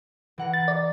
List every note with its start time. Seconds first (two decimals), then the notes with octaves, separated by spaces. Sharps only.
0.38 E3 F#5 A#5
0.53 A6
0.68 D5